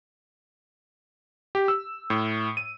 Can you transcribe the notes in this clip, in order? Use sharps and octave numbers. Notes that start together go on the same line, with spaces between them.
G4
E6
A2
D#7